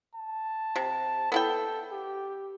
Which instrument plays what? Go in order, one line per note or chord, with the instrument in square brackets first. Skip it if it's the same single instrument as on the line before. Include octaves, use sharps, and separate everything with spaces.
[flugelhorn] A5
[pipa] C3
[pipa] B3 E4 G5 [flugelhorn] A4
[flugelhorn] G4